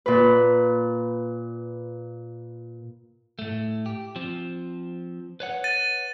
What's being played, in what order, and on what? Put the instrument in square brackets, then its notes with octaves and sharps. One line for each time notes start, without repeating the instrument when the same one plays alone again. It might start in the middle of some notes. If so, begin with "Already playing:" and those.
[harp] A#2 B4
[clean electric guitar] A2 A3
G4
F3 C4
B4 C#5 F#5
[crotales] A6 D#7